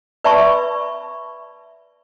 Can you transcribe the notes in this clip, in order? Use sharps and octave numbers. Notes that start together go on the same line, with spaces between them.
B4 D5 E5 A5 B5 C#6